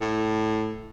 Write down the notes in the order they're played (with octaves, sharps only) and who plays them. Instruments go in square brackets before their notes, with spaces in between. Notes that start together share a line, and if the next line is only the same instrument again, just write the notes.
[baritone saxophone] A2